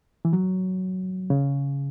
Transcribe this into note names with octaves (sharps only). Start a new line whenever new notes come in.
E3
F#3
C#3